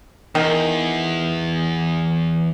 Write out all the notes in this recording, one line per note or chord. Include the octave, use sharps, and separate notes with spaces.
E2 D#3